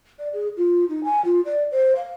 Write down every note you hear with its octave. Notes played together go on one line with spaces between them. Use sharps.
D5
G#4
F4
D#4
G#5
F4
D5
C5
F5